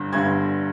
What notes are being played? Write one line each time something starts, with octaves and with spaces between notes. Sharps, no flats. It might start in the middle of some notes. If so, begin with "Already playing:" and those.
Already playing: G1 G2 D3
G1 G2 D3 G#6